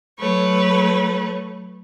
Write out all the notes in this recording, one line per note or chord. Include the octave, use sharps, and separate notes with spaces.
F#3 A3 B4 C#5